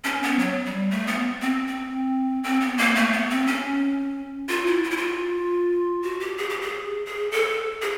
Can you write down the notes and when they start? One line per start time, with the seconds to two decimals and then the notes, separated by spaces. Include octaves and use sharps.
0.04 C#4
0.23 B3
0.39 F#3
0.65 G3
0.91 A3
1.07 B3
1.42 C4
1.67 C4
2.44 C4
2.61 B3
2.78 A#3
2.95 A3
3.13 B3
3.30 C4
3.47 C#4
4.49 F4
4.66 E4
4.83 F4
4.90 E4
4.97 F4
6.02 F#4
6.20 G4
6.38 G#4
6.49 G4
6.61 G#4
7.06 G#4
7.32 A4
7.82 G#4